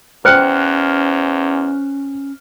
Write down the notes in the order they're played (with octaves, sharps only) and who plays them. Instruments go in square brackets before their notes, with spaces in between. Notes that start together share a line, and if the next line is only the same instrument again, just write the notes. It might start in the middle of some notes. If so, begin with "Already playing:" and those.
[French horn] E2 [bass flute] C#4 [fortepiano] C5 G5 [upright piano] F6 F#6 C#7